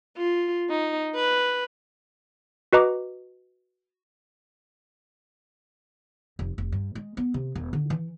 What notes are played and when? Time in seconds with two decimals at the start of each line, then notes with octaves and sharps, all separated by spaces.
0.17 F4
0.70 D#4
1.15 B4
2.73 F#4 B4 D#5 A#5 D6
6.39 F1
6.58 F1
6.72 G2
6.95 G#3
7.17 B3
7.34 C3
7.55 E1
7.73 D3
7.90 E3